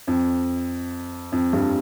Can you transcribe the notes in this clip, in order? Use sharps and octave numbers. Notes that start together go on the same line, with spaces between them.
F2
F2
G2